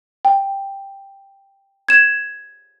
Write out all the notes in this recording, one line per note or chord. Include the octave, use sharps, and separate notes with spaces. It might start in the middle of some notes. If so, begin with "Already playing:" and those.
G5
G#6 E7